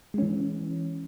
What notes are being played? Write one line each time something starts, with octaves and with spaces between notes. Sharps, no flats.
E3 G#3 C#4